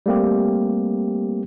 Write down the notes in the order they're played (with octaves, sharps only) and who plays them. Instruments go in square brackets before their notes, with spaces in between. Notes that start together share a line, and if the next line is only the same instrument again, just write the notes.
[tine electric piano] G3 A3 A#3 C4 G4